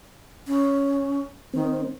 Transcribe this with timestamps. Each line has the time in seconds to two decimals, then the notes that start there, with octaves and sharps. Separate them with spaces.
0.47 C#4
1.53 D#3 C4